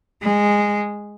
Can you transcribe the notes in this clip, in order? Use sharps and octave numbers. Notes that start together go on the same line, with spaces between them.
G#3